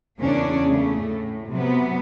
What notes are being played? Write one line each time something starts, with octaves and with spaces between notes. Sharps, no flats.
E2 C#3 A#3 C#4 D4
C#3 A3
A2
C3 F#3 B3